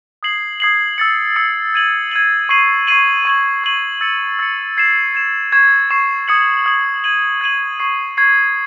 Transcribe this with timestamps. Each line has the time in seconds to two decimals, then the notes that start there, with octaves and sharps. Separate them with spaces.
0.23 D#6 G#6 C7 F#7
0.60 D#6 G#6 C7 F#7
0.98 E6 A6 C#7
1.36 E6 A6 C#7
1.74 G#6 D#7 F#7
2.12 G#6 D#7 F#7
2.49 C#6 G#6 C7 D#7 F#7
2.87 C#6 G#6 C7 D#7 F#7
3.25 C#6 G#6 D#7 F#7
3.64 C#6 G#6 D#7 F#7
4.01 E6 A6 C#7
4.39 E6 A6 C#7
4.77 G#6 C7 E7
5.15 G#6 C7 E7
5.52 C#6 G#6 C7 E7
5.90 C#6 G#6 C7 E7
6.28 D#6 G#6 C#7 F#7
6.66 D#6 G#6 C#7 F#7
7.04 G#6 D#7 F#7
7.41 G#6 D#7 F#7
7.79 C#6 G#6 C7
8.17 C#6 G#6 C7